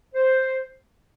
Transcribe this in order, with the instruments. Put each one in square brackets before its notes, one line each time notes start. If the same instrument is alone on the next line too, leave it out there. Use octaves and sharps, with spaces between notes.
[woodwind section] C5